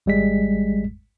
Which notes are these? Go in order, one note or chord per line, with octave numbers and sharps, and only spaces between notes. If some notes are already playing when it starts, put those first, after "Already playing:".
G#1 G3 G#3 B6